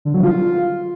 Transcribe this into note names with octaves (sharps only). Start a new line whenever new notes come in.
D3
F#3
F4